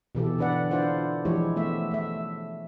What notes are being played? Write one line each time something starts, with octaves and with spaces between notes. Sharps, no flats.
B2 E3 G4 A4
D3 D4 B4 D5 F#5
D4 E4 F4 C5 D5 F#5
E3 F3 G#3 E4 G4 C#5
A3 B3 E5
A3 E5